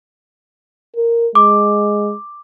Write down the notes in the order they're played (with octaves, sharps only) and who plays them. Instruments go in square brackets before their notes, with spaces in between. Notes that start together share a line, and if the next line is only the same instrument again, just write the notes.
[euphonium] A#4
[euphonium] G#3 [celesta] D6